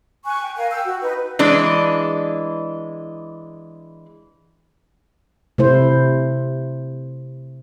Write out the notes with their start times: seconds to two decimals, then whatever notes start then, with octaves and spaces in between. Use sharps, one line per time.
0.25 G#5 C#6 F#6
0.42 G5
0.56 A#4 F5 G#5
0.70 G5 E6
0.84 F#4
1.02 D#4 B4
1.39 E3 G#3 D4
5.58 C3 A3 E4 C5